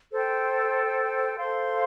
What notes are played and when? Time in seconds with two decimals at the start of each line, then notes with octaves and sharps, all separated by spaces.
0.12 A4 C5 G5
1.37 A4 C5 F5 C6